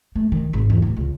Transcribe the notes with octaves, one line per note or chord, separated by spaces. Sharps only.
A3
D#3
G#1
E2
D1
C#2